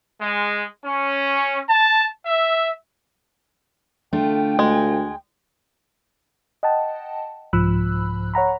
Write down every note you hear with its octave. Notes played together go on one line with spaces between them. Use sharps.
G#3
C#4
A5
E5
D3 A3 F4 G5
D2 G#3
D#5 F#5 G5 A5
C2 G#2 F3 B5 E6 F#6
C#5 F#5 A#5 B5